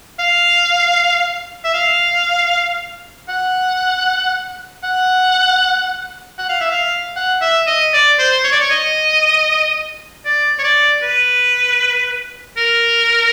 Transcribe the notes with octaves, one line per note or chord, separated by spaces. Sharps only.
F5
E5
F5
F#5
F#5
F#5
F5
E5
F5
F#5
E5
D#5
D5
C5
C#5
D5
C#5
D#5
D5
C#5
D5
B4
A#4